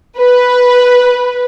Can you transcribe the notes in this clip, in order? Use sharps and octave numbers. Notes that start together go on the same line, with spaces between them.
B4